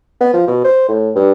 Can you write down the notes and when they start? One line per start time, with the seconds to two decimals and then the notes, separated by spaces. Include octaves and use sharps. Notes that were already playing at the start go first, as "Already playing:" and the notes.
0.21 B3
0.34 F3
0.47 B2
0.64 C5
0.88 A2
1.16 G2